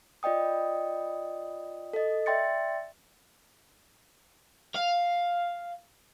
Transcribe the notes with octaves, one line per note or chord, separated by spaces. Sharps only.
F4 D5 D#5 G5 D#6
A4 D#5
D5 E5 G5 C6 A6 C#7
F5